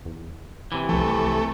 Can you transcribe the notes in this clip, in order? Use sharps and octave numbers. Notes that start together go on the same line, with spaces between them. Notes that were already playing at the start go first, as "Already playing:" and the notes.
E2
C3 E3
C2 F3 A3